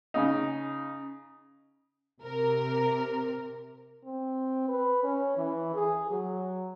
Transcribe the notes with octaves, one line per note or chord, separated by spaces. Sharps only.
C#3 D#4
C3 A#4
C4
B4
C#4
E3
G#4
F#3